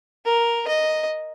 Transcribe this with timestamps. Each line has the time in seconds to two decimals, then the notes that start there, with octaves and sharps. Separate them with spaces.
0.25 A#4
0.67 D#5